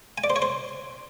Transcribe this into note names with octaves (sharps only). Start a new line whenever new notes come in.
G#5
D5
C5
C#5
C5